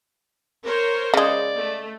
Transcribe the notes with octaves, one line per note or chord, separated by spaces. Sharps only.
A#4 C5 C#5
C#3 G#3 D5
A3